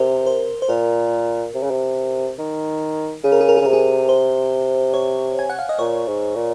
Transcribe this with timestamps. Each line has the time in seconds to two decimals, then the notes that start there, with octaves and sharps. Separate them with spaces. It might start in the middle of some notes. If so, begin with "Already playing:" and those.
Already playing: C3 A#4 C5
0.26 C5
0.62 C5
0.68 A#2 A#4
1.54 C3
1.62 C#3
1.70 C3
2.38 D#3
3.23 C#3 G#4
3.32 A#4
3.41 G#4
3.49 A#4
3.57 G#4
3.61 C#3
3.65 C3 A#4
3.73 G#4
4.09 C5
4.94 C#5
5.39 G#5
5.49 F#5
5.59 F5
5.69 D#5
5.79 A#2 C#5
6.07 G#2
6.35 A#2